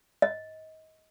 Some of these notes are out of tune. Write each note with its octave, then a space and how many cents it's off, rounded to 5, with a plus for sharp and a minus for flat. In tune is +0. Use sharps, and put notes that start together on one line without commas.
D#5 +25